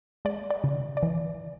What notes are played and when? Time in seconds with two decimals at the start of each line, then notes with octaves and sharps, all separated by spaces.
0.25 G#3 D5
0.51 D5
0.64 C#3
0.97 D5
1.03 E3